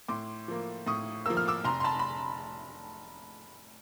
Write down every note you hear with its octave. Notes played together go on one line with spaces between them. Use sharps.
A2 C6 D6
F3 A#3
A2 C#6 D#6
F3 A#3 E6
F6
D6 E6
F1 A#5 C6
C6
A5 B5
B5